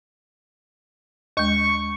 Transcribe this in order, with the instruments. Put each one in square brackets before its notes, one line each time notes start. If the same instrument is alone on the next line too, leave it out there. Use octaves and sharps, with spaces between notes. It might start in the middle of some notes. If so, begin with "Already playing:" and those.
[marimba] D#2 G#3 [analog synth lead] C#6